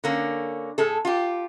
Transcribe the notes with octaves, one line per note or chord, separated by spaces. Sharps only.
D3 A#3 C#4
A2 G#4 A4
F4 G4